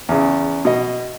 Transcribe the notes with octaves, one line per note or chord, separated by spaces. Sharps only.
E2 C#3
B2 D#5